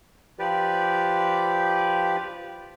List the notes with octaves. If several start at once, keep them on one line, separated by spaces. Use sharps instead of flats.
F3 G4 B4 D5